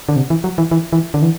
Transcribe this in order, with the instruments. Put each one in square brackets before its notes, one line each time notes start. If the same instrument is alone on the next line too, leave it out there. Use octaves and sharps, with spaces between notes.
[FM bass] D3
C3
E3
F#3
E3
E3
E3
D3
E3